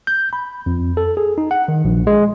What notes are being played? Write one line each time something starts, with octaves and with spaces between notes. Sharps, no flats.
G6
B5
F2
A4
G#4
D#4
F#5
D#3
A#1
G#3